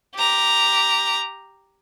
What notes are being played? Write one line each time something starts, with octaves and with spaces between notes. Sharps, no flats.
G4 A#5